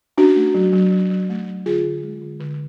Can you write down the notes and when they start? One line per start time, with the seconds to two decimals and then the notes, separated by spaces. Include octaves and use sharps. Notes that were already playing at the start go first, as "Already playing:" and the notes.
0.18 C#4 D4 F#4
0.36 A3
0.55 F#3
0.73 F#3
0.92 F#3
1.11 F#3
1.29 A3
1.48 F#3
1.66 D3 F4 G#4
1.84 D3
2.03 G#3
2.22 D3
2.40 D3